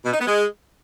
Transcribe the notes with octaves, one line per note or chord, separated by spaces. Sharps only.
B2
D#4
B3
G#3